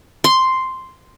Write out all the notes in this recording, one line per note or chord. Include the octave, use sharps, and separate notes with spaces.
C6